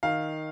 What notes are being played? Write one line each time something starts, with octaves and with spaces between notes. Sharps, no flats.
D#3 F5